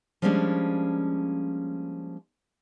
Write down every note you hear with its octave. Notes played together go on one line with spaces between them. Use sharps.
F3 G3 G#3 A#3 C#4 D4